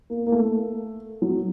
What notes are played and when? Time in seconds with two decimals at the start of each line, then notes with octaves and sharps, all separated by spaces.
0.10 A#3
0.26 A#3
0.32 A3
1.22 F#3